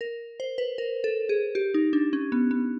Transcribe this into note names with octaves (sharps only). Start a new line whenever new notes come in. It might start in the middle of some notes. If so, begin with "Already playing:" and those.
A#4
C5
B4
A#4
A4
G#4
G4
D#4
D4
C#4
B3
B3